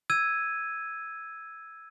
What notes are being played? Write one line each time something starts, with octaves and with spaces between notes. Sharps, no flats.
E6 G#6 D#7